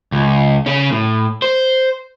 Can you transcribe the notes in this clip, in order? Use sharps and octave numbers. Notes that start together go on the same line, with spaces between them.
C#2
C#3 C#4
A2
C5